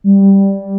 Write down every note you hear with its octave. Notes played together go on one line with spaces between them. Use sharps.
G3